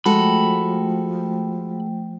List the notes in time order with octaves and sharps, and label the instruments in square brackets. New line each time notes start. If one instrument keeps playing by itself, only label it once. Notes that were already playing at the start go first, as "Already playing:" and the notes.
[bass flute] F3 [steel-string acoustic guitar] G#3 F#4 A4 [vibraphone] A3 G5 [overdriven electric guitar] B5